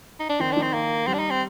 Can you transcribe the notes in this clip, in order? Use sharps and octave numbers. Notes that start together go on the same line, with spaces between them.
D#4
D4
D#3 C4
D#3 D4
C4
A#3
G3 C4
D4
D#4
C4